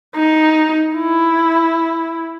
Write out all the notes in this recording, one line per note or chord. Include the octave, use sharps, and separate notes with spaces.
D#4
E4